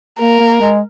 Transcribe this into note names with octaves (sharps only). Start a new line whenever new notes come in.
A#3 A#4
A#3
G#3